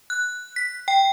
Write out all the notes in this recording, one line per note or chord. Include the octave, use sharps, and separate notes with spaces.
F#6
B6
G5